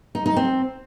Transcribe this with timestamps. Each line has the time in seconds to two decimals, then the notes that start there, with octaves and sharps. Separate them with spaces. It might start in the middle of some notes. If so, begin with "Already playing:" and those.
0.15 D#4
0.26 D#4
0.36 C4